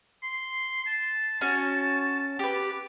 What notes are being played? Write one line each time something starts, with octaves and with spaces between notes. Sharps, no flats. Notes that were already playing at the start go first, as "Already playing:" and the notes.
C6
A5
C#4 F#4
G4 B4